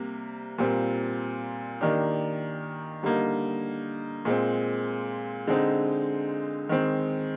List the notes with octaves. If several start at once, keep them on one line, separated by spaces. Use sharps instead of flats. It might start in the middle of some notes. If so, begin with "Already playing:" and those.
Already playing: C3 G3 A#3
A#2 G3 C4 F4 A#4
D#3 A#3 D4 G4 A#4
D3 G3 A#3 D#4
A#2 G#3 C4
D3 G#3 C4 D#4
D#3 G#3 C4